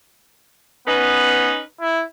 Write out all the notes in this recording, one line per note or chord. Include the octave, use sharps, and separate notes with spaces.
B3 C#4 D#4 B4
E4